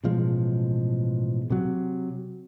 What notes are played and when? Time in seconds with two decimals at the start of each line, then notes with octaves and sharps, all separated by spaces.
0.04 A1 B2 F3 G#3
1.50 C3 F#3